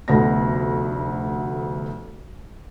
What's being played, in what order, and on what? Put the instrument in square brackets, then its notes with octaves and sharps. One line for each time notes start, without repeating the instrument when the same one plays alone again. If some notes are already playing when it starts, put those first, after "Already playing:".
[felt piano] F1 D2 A3 B3 D5 A#6